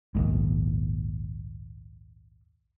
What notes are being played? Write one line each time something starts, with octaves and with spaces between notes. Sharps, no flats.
A#1 D#2 G#2